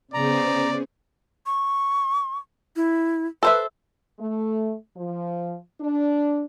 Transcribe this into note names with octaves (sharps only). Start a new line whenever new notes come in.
C#3 B3 G#4 C5 D5 A#5
C#6
E4
A4 B4 C5 E5
A3
F3
D4